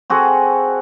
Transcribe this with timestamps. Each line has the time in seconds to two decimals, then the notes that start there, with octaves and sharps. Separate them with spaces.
0.10 C4 F#4 G#4 A4